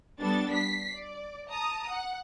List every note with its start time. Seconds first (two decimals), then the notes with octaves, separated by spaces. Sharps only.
0.21 G3 B3 D4 A4 A6
0.52 B6 C7
0.94 D5
1.51 A5 A#5 D#6
1.90 F#5